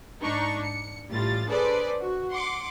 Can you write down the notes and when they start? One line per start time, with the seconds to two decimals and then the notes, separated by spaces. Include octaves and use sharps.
0.21 G#2 D4 D#4 C#6
0.62 C#7
1.10 A1 A2 G3 F4 A6
1.47 D4 G#4 A4 B4 C5 D5
1.99 F#4
2.30 F#5 C6 D6